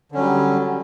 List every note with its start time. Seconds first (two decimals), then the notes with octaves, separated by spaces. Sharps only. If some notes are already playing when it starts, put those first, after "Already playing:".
0.12 D3
0.15 C#4
0.17 F#3
0.20 G3